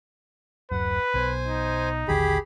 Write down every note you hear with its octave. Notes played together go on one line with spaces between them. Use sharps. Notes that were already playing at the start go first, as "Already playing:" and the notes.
D1 F#2 B4 F#5
B1 B2 C5 G#5
D#4
A1 D#2 D3 G4 G#4 B5